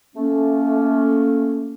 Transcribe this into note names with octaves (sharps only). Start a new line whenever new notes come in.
A3 A#3 C#4